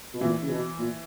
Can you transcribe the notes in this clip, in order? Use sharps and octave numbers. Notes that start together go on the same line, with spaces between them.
B2
A#2 E3
C#3
B2
A#2